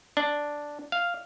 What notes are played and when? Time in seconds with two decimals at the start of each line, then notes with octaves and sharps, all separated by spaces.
0.17 D4
0.92 F5